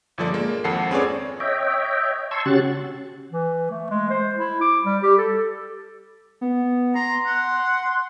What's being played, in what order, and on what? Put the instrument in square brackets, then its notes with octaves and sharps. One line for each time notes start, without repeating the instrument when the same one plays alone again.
[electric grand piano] G1 A#2 F3 A4 D5
G#3 A#3
G#1 F2 A4 F#5 C7
C4 C#4 G#4 B4 C#5 D5
[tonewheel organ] C#5 D#5 E5 G5
A5 C6 C#6 E6 G#6
C#3 C#4 F#4 G4 F#6 A6
[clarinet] E3
A3
G#3
C5
E4
D6
G3
G4
A4
[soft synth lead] B3
[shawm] A#5 [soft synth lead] C6
[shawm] F#5